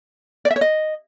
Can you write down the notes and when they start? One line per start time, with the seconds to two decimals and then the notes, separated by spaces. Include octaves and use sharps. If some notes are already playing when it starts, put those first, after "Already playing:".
0.45 D5
0.51 E5
0.56 C#5
0.61 D#5